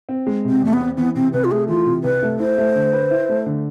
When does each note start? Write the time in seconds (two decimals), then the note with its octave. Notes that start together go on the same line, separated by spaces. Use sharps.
0.09 C4
0.26 G#3
0.44 C3
0.50 C4
0.61 E2 A3
0.73 B3
0.80 C4
0.97 E3 B3
1.15 C3 C4
1.33 C2 B4
1.44 F4
1.51 A3 G#4
1.68 E3 F4
1.86 C3
2.04 C2 B4
2.22 A3
2.39 E4 C5
2.58 A3
2.75 D3
2.93 B4
3.11 E4
3.29 A3
3.46 D3